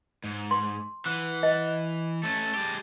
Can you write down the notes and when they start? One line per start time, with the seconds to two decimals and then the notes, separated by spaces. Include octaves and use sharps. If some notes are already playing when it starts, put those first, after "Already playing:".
0.24 G#2
0.51 C6
1.06 E3 F#5
1.43 D#5
2.23 A3 C#4 A5
2.55 G#3 G4